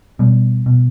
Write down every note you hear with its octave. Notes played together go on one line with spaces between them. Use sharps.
B2 G3
B2